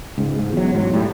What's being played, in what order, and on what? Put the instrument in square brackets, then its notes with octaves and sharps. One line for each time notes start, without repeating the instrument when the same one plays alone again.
[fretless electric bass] C#2 G#2
G#2
E2 F#3
E1 G#2 F#3
A2 G3